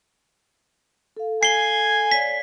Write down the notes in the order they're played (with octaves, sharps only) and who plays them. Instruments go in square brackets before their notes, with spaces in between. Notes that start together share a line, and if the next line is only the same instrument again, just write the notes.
[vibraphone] A4 F5
[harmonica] G#5 [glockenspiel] C7 G7
[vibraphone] C#5 D5 F5 [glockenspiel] B6